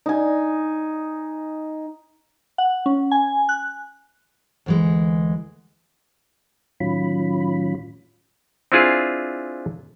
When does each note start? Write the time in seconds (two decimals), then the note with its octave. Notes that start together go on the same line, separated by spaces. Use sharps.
0.06 D#4 G#5
2.58 F#5
2.86 C#4
3.11 G#5
3.49 F#6
4.66 D2 E3 G#3
6.80 A2 D#3 F#3 C#4 F4 B5
8.72 C4 D4 E4 F4 G#4